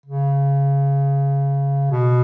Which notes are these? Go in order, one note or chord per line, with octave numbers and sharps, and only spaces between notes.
C#3
B2